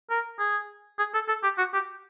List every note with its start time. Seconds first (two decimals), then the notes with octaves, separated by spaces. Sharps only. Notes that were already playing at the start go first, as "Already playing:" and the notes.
0.10 A#4
0.39 G#4
0.99 G#4
1.14 A4
1.28 A4
1.43 G4
1.58 F#4
1.73 G4